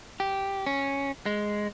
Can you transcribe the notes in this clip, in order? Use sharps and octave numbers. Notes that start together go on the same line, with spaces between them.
G4
C#4
G#3